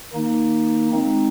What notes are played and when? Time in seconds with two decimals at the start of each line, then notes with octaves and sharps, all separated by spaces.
0.13 D#3 A#3 D#4
0.92 G#3 C4 D#4